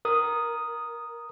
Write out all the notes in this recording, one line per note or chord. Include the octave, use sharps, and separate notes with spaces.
A#4 D#6